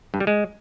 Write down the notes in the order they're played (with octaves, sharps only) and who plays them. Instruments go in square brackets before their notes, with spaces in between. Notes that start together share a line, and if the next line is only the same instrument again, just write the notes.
[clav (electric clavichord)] G2
G3
G#3